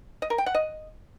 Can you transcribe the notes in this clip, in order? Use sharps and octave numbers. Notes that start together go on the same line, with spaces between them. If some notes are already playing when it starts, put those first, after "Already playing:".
D#5
A#4
G5
F#5
D#5